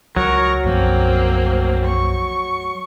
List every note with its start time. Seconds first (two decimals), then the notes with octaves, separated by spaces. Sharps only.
0.16 C#2 F#3 A#4 C#6
0.65 B1 F#2 F3 A#3 C4
1.86 C#6